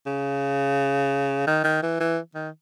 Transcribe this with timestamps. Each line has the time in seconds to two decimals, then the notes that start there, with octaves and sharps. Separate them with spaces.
0.06 C#3
1.47 D#3
1.64 D#3
1.83 E3
2.00 E3
2.35 D#3